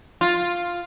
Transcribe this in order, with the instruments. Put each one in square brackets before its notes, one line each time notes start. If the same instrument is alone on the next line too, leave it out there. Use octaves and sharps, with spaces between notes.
[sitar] F4